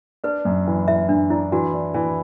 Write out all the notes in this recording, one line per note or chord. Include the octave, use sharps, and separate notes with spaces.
D4 B4
F#2
E3
E3 E5
F#2 D4
D4 E4
E3 F#4
D4
E3